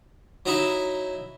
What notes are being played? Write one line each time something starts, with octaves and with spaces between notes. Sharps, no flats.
F#3 D#4 E4